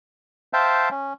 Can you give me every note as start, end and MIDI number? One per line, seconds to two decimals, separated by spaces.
0.53 0.89 72
0.53 0.89 76
0.53 0.89 77
0.53 0.89 79
0.53 0.89 81
0.91 1.13 61